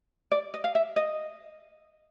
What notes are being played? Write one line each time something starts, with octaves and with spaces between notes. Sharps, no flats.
D5
D#5
F5
E5
D#5